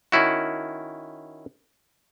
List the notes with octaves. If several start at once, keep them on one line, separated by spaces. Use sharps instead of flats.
D#3 C#4 E4 F#4